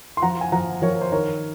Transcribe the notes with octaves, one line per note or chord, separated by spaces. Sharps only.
C6
F3 F#5 A#5
G#5
F3 F#5 A#5
F3 A#4 C#5
C5
D#3 A#4 C#5